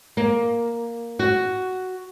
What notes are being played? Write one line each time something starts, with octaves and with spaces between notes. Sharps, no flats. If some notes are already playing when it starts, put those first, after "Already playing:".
A#3
F#4